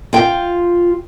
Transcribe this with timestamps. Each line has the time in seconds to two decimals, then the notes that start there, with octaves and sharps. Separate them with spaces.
0.13 F4 G5